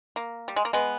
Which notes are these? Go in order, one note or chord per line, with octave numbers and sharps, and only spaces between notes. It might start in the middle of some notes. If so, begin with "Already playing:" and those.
A#3
G3
G#3
A#3
G#3 B3